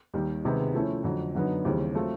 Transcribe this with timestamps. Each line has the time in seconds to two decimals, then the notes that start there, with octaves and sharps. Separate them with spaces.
0.14 D#2 D#3 G3
0.44 C#2 C3 D#3 G#3 B3
0.74 F3 A3 C#4 E4
1.04 F2 D3 F#3
1.35 F#2 D3 F#3 B3 D#4
1.65 D#2 C#3 E3 G3 C4
1.95 F#3 A3 C4 F4